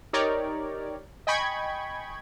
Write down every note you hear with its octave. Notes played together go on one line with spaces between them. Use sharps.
D#4 G4 A#4 C#5 D5
D#5 G5 G#5 B5 C#6 G#6